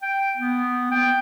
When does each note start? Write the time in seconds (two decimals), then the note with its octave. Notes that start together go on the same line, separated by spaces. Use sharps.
0.02 G5
0.37 B3
0.91 G5